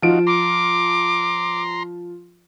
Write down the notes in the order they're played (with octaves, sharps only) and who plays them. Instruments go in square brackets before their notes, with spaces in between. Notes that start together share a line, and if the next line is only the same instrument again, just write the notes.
[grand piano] F3 D7 [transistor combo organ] D#4 F4 F#4
[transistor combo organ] A#5 C6 [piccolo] D6